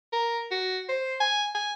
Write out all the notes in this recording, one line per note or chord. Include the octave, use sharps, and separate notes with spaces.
A#4
F#4
C5
G#5
G#5